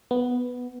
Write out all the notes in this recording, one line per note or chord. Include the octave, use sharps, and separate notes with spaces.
B3